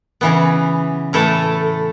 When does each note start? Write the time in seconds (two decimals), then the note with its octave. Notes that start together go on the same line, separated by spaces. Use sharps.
0.21 C#3 E3 B3
1.13 A2 E3 A3 E4 A4